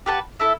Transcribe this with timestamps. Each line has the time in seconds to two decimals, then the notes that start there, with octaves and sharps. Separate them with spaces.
0.06 G4 B4 F#5 A5
0.40 E4 A4 E5